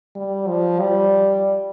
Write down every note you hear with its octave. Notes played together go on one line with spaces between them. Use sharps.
G3
F3
G3